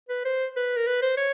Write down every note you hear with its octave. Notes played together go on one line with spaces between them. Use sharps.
B4
C5
B4
A#4
B4
C5
C#5